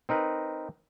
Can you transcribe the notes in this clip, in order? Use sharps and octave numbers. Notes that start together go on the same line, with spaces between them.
C4 D#4 A#4 B4